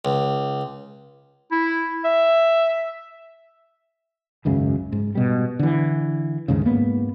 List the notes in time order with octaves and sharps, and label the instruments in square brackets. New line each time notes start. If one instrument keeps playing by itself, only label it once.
[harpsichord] C#2
[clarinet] E4
E5
[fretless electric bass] G#1 C#2 F#2 C#3
G#2
B2 G3
D3 E3
D#2 G#2 C#3
G#2 A#3 B3